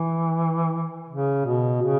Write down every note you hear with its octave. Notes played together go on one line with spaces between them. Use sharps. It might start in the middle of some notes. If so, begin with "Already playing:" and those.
Already playing: E3
C#3
B2
C#3